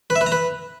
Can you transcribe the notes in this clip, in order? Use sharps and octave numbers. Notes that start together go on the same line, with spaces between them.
B4
E5
B4
A#5
B4